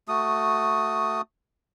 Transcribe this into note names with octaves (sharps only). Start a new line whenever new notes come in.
A3 F#4 D#6